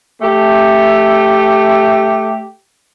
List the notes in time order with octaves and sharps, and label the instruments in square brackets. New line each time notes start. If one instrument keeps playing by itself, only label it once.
[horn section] A3 G4